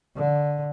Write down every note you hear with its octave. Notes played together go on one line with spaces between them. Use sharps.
D3